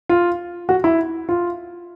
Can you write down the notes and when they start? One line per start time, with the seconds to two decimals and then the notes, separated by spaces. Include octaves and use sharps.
0.09 F4
0.69 F#4
0.84 E4
1.29 F4